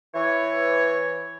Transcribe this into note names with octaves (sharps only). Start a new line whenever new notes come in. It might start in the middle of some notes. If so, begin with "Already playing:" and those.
E3 C#5